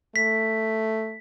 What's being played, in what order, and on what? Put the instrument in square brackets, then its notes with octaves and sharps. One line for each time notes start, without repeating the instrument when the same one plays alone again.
[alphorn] A3 [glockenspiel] B6